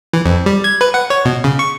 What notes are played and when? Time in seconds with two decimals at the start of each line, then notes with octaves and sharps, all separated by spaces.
0.13 E3
0.26 F2
0.46 G3
0.64 G#6
0.81 B4
0.94 F#5
1.10 C#5
1.25 B2
1.44 C#3
1.59 C#6